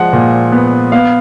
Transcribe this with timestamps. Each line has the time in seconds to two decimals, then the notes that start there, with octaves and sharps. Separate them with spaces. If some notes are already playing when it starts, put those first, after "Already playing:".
Already playing: F3 G#3 F#5
0.13 A#2
0.52 B3
0.92 B3 F5